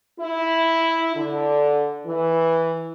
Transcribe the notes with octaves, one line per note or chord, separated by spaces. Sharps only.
E4
D3
E3